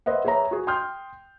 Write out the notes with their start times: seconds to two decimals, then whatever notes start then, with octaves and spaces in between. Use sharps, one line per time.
0.06 B4 C5 D#5 E5 F#5
0.25 G#4 B4 C#5 E5 A#5
0.51 F#4 G#4
0.67 G5 C6 D#6 F6 G6